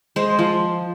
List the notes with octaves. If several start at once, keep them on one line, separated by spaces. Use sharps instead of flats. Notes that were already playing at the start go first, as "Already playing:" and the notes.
G#3 C5
F3